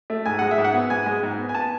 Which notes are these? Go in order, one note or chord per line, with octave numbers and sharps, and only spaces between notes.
A3
G#2 G#5
G#3 F#5
E5
G#2
F#5
B3
G#2 G#5
G#3
G#2
B3
G#5
B3 A5